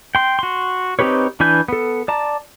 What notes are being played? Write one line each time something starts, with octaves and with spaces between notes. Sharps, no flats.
G5 C6
F#4 C6
C4 D#4 G4 B4 C#5
E3 D4 B4 G#5 G6
B3 A4
D5 A5 A#5